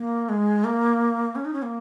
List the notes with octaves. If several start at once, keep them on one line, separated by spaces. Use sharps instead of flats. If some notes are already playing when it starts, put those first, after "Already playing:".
Already playing: A#3
G#3
A#3
C#4
D#4
C#4
A#3